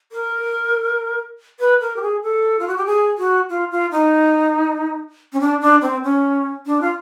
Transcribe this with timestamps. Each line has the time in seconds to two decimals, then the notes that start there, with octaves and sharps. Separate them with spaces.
0.12 A#4
1.59 B4
1.80 A#4
1.96 G4
2.02 G#4
2.23 A4
2.59 F4
2.68 F#4
2.77 G4
2.86 G#4
3.18 F#4
3.50 F4
3.71 F4
3.91 D#4
5.33 C#4
5.40 D4
5.61 D4
5.82 C4
6.04 C#4
6.66 D4
6.81 F4